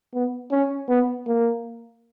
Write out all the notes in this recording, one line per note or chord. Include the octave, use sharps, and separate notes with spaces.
B3
C#4
B3
A#3